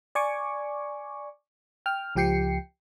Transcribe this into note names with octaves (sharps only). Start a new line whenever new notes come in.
D5 G#5 C#6 D6
G5 F6
C#2 F3 G4 G5 C7 C#7